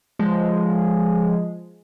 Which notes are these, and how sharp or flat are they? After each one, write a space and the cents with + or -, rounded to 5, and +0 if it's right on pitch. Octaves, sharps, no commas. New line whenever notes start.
F3 +0 G#3 +0